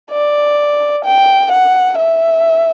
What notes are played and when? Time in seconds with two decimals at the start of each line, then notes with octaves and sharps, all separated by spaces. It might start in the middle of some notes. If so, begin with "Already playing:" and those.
0.11 D5
1.05 G5
1.52 F#5
1.98 E5